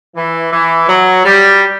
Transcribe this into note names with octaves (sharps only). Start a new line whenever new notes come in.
E3
E3
F#3
G3